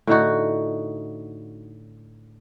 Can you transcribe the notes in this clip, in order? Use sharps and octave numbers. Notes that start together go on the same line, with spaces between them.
A2 D3 D#4 F#4